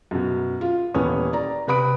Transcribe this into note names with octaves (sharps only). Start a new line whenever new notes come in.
F#2 B2
F4
D#1 E3 B3 C#4 D#6
D5 A#5
C3 B4 B5 D#6 D7